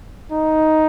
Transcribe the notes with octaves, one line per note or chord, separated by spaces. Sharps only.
D#4